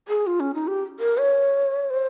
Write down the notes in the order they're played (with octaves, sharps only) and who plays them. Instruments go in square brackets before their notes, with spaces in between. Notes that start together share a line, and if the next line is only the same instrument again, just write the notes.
[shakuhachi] G#4
F4
C#4
D#4
G4
A#4
C#5
C5